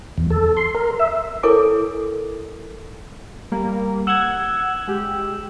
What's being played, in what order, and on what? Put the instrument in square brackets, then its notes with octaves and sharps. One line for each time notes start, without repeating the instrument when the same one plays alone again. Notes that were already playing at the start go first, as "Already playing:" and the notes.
[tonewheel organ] E2
A4
C6
A#4
E5
[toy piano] E4 A4 A#4 C#5 G#5 D6
[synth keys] G3 A#3
[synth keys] F#5 G#6 [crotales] E6 E7 F#7
[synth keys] G#3 G4